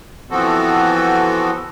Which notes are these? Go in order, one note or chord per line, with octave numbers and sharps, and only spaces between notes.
E3 F3 B3 C4 F#4 A4